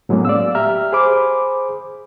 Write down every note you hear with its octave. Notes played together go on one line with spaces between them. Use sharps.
A2 F#3 G#3 A#3 B3 C#4
D5 F5 E6
G4 E5 A#5 F6
G#4 C5 B5 D6